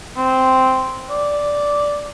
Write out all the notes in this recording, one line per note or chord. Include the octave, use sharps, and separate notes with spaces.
C4
D5